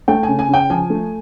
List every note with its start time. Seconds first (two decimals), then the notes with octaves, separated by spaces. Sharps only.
0.08 A3 G5
0.23 G#5
0.28 C#3
0.39 G#5
0.49 C#3 G5
0.70 F3 G#5
0.90 A3